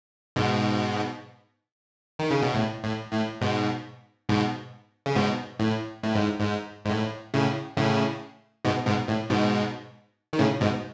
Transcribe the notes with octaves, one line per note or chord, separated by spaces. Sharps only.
G#2 B2
D#3
C#3
B2
A2
A2
A2
G#2 B2
G#2 B2
C#3
G#2 B2
A2
A2
G#2
G#2
G#2
A2
A2 C#3
A2 C#3
G#2 B2
G#2 B2
A2
G#2 B2
D#3
A2 C#3
G#2 B2